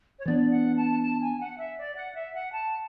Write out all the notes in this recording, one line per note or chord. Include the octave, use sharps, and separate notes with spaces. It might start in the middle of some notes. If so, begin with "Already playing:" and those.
C#5
E3 B3 D4 D5
F#5
A5
A5
G#5
F#5
E5
D5
F#5
E5
F#5
A5